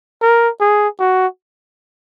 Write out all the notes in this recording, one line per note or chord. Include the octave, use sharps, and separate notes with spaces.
A#4
G#4
F#4